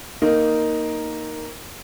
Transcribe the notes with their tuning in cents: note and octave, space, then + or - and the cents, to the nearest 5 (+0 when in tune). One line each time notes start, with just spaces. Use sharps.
A#3 +0 D#4 +0